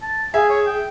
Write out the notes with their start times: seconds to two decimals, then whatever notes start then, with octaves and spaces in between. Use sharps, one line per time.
0.02 A5
0.34 G#4 E5 G#5
0.50 C#5
0.66 G5